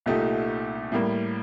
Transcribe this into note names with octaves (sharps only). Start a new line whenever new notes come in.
C2 A#2 A3 D#4 G4
A2 G3 A#3